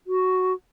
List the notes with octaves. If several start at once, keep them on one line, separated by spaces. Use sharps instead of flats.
F#4